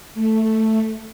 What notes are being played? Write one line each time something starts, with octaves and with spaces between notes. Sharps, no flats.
A3